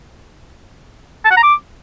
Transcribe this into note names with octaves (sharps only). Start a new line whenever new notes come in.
A5
F#5
A#5
D6